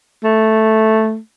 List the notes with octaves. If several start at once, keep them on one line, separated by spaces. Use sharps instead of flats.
A3